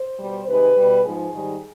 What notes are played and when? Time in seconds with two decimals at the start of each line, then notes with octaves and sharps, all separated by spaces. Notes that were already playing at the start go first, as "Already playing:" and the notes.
Already playing: C5
0.19 B2 G3
0.48 C3 D#3 G#3 B4
0.76 B2 G3
1.04 G#2 F3 G#3 G#4
1.33 G#2 D#3 G3